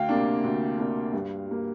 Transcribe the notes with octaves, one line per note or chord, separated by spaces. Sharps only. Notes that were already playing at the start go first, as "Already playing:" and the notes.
Already playing: D2 F5 G5
C3 A#3 D4
D2
C3 A#3 D4
G2
G3 A#3